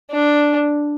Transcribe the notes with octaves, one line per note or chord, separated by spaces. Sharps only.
D4